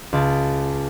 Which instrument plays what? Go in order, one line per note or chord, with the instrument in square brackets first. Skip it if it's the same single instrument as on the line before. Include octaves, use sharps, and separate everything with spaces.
[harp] C#2 A5 A6